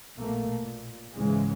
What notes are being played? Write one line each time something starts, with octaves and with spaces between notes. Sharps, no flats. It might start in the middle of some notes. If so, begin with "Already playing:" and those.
A#1 B2 A3 A#3
A#2
C#2 G#2 C#3 E3 G#3